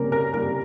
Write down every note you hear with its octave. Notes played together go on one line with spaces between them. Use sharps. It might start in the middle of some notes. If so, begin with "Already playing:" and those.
Already playing: C#3 G3 A#3 A#4
A#4
G3 A#3 A#4